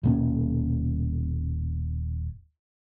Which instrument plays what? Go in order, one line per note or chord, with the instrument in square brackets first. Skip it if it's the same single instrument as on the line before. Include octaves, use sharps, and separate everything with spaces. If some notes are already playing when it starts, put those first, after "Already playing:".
[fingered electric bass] D#1 B2 A#3 C#4